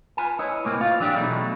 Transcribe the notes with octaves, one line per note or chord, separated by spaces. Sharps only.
F4 B4 G#5
E4 B4 C#5 D#5
C2 A2 A#3 C4
F4 F5
E3 F#3 D4 G4 G#4
B2 F#3 A3 D#4